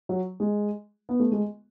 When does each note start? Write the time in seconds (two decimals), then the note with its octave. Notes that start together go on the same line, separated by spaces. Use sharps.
0.09 F#3
0.40 G#3
1.09 B3
1.20 A3
1.32 G#3